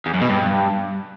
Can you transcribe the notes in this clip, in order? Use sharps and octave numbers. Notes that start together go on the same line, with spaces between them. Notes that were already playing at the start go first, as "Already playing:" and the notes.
E2
F#2
B2
G2